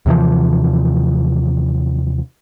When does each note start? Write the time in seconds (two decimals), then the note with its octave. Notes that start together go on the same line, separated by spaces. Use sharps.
0.06 D#2 C3 E3 F3